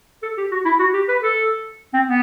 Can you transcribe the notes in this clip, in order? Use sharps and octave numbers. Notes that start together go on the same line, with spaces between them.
A4
G4
F#4
E4
F#4
G4
B4
A4
C4
B3